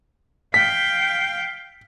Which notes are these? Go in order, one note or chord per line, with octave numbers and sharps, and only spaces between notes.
F5 G5 B6